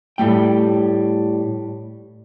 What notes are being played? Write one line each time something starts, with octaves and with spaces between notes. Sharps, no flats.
A2 G3 A3 G5